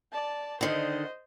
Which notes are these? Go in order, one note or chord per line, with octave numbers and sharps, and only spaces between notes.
D5 A5
D3 D#3 C5 D#5